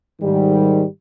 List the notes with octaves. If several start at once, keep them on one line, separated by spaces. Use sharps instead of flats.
G#2 D#3 G3